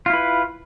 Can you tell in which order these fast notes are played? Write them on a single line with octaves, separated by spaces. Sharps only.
F4 E4 B4